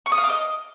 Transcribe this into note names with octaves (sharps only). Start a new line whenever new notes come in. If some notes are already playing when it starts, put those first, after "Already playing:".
C#6
D#6
F5
D6
D#5